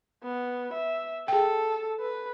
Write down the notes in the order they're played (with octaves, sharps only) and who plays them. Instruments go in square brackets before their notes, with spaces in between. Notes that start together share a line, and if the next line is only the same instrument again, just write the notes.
[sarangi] B3
E5
[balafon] G#4 G5 [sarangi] A4
[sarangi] B4